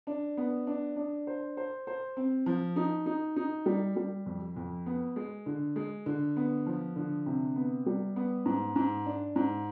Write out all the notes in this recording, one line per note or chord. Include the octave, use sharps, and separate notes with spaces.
D4
B3
D4
D4
C5
C5
C5
C4
F3
D#4
D#4
D#4
G3
G3
F2
F2
B3
G#3
D3
G#3
D3
B3
F3
D3
C3
B3
G3
B3
G#2
G#2
D4
G#2